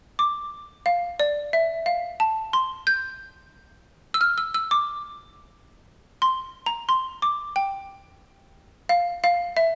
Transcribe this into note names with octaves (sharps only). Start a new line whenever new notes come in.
D6
F5
D5
E5
F5
A5
C6
G6
E6
F6
E6
E6
D6
C6
A#5
C6
D6
G5
F5
F5
E5